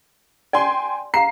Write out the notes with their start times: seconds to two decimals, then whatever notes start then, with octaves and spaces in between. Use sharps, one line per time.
0.53 D5 G5 G#5 C6
1.14 F5 A#5 C7